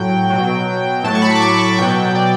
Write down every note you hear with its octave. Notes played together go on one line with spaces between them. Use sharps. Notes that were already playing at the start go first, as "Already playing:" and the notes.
Already playing: A2 F#3 G5
B2 F#3
A2 F#3 A5
C#6
B5
D6
C#6
A5
B2 F#3 G5
D5